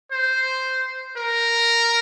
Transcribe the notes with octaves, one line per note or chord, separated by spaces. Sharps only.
C5
A#4